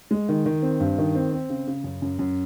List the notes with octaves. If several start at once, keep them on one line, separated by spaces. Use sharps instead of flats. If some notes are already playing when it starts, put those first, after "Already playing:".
G#3
D#3
D#3
C4
G2
D#3
C4
C4
C#3
C#3
F#2
F#2
F#2